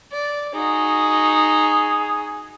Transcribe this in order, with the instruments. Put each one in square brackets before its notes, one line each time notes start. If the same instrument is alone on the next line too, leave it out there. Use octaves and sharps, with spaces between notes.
[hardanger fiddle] D5
[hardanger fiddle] D#4 F#4 [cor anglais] G#4